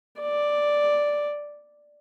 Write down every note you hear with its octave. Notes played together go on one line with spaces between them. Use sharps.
D5